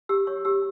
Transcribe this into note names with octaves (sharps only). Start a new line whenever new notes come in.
G4 E6
C#5 C#6
G4 E6